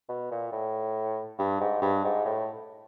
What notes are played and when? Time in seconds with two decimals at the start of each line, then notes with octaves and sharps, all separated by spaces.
0.09 B2
0.31 A#2
0.52 A2
1.38 G2
1.60 G#2
1.82 G2
2.04 G#2
2.25 A2